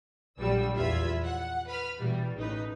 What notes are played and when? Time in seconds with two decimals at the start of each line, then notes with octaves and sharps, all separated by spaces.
0.38 A#1 D3 F#3 G3 E6
0.74 E2 F4 E5 B5 E6 G#6
1.24 F#5
1.68 B4 B5 F6
1.97 B2 E3 G3
2.35 A1 C#3 D#4 B4